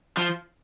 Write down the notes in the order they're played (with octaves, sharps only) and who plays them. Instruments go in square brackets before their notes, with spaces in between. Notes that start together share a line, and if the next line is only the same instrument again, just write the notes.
[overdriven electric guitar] F3